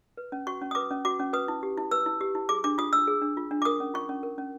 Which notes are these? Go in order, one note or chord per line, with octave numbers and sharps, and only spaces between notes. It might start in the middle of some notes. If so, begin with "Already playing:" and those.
B4
C#4
F#4 C#6
C#4
D#6
B4 D6
C#4
F#4 D6
C#4
B4 D#6
E4
G4
E4
B4 E6
E4
G4
E4
G#4 D6
D4 D6
F4 D#6
D4 E6
G#4
D4
F4
D4
D6
A#4 D#6
C#4
F4 C#6
C#4
A#4
C#4